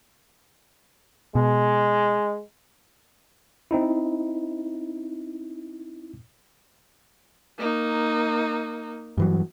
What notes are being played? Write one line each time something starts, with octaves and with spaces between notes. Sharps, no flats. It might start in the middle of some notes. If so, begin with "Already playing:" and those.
B2 G#3
C4 D#4 E4
A#3 D#4
G2 E3 F#3